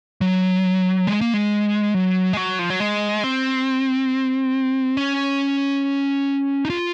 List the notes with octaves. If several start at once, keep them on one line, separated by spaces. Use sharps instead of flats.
F#3
G#3
A#3
G#3
F#3
G#3
F#3
F3
F#3
G#3
C4
C#4
D#4
F4